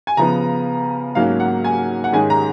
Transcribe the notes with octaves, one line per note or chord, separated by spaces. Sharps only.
G#5
C#3 F3 B3 A#5
G#2 F#3 A#3 C#4 F5
F#5
G#5
F#5
G#2 D#3 G#3 C#4 G#5
A#5